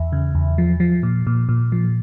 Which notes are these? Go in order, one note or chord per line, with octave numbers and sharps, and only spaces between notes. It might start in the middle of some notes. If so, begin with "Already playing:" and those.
Already playing: E2 E5
C#3
E2
F3
F3
A#2
A#2
A#2
F3